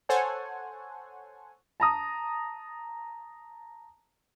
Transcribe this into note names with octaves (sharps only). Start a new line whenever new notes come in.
A4 C5 C#5 F#5 G#5
A5 A#5 D#6